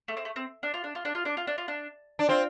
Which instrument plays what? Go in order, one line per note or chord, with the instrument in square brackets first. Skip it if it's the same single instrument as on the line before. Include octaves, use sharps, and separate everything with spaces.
[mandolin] A3
C4
A3
C4
D4
F4
D4
F4
D4
F4
D4
F4
D4
F4
D4
[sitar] D4
[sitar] C4 [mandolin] F4